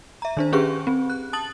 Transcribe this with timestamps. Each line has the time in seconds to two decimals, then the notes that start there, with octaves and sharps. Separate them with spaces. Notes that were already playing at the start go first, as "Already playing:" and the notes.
0.22 E5 A#5
0.37 D#3 D4 C5
0.53 C#4 G4 G#4 B4 C#6
0.87 C4
1.10 F#6
1.33 A5 D#6 A6 F#7